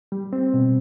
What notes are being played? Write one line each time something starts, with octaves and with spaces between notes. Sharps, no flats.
G3
C4
B2